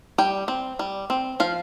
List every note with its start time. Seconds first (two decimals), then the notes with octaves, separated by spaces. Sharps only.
0.18 G3 G5
0.48 C4
0.79 G3
1.10 C4
1.40 F3 F5